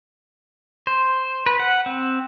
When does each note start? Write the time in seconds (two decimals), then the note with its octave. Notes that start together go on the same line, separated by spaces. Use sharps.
0.87 C5
1.46 B4
1.59 F#5
1.86 C4